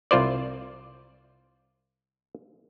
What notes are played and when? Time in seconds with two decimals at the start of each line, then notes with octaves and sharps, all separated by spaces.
0.11 C2 F4 C5 D5